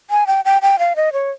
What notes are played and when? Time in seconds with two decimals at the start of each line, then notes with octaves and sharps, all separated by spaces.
0.10 G#5
0.27 G5
0.45 G5
0.62 G5
0.79 F5
0.96 D#5
1.13 C#5